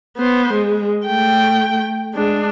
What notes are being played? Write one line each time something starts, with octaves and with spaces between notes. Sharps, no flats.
B3 C5
G#3
A3 G5
G#3 D4